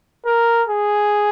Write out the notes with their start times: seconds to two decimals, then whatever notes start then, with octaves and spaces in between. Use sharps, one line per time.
0.26 A#4
0.68 G#4